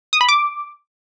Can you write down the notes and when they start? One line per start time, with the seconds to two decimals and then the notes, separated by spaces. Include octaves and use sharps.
0.13 D#6
0.21 B5
0.29 D6